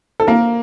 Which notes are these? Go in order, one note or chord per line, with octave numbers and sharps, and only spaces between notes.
A4
A#3 A#4